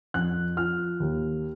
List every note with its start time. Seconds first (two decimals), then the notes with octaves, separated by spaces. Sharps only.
0.14 F2 F#6
0.57 F3 F6
1.00 D#2